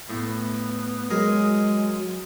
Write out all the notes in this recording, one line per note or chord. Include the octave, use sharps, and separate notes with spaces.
A2 B3
F#3 G#3 G#4 A#4